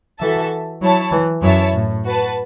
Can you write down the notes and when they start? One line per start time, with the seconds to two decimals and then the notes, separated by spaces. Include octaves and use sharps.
0.20 E3 F#4 A4 E5 A5
0.81 F#3 E4 C#5 A5
1.12 E3
1.42 F#2 E4 C#5 E5 A5
1.74 A2
2.04 F#4 B4 A5